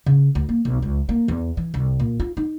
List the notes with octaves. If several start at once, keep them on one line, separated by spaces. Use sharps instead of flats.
C#3
D2
A#3
B1
C#2
A#3
E2
E3
C2
A#2
F4
D#4